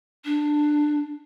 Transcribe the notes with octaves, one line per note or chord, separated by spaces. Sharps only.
D4